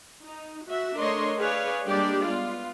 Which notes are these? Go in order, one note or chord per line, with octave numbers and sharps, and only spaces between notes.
D#4
F#4 E5
A3 D4 A#4 C#5 D#5 C6
G#4 B4 C#5 D5 F5
G3 G#3 A#3 D4 G4 D5
B3 F4